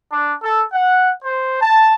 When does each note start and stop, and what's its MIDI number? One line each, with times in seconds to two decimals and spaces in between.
0.12 0.35 62
0.43 0.63 69
0.73 1.11 78
1.24 1.57 72
1.61 1.95 81